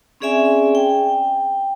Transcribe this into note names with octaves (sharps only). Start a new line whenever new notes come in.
C4 C#4 G#4 D5 E5 G#5
G5